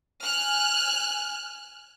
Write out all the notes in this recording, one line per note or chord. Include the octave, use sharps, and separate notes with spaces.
G#5 F6 F#6